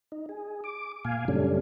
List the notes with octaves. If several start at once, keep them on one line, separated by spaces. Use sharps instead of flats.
D#4
G#4
D6
A#2 F5 G#5
F#2 C#3 G3 A3 C#4 D4